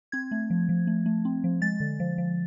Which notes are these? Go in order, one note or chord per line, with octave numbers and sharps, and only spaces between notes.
C4 G#6
A3
F3
F3
A3
A3
C4
F3
G#3 A6
D3
F3
F3